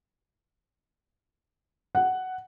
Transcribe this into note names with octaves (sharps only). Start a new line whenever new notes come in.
F#5